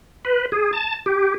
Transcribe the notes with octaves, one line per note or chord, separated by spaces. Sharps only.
B4
G#4
A5
G4